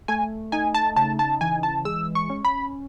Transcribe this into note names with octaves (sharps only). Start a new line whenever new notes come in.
A3 G#5
D#4 G#5
A5
C#3 A5
A5
E3 G#5
A5
G#3 E6
C#6
C#4
B5